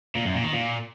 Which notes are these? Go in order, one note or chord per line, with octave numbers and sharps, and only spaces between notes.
A#2
F#2
A#2
D#3
A#2